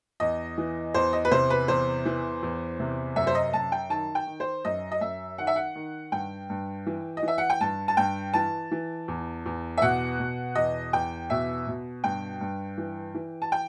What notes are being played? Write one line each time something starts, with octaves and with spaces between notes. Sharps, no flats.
E2 D#5
E3
E2 C5
D#5
B4
C3 C5
B4
E2 C5
E3
E2
C3
F#2 E5
C5
D#5
F#2 A5
G5
D#3 A5
G5
D#3
C5
F#2 D#5
D#5
F#2 E5
D#3 F#5
E5
F#5
D#3
G2 G5
G2
E3
D#5
E3 E5
F#5
G5
G2 A5
A5
G2 G5
E3 A5
E3
E2
E2
E5
B2 F#5
B2
E2 D#5
E2 G5
B2 E5
B2
G2 G5
G2
E3
E3
A5
G5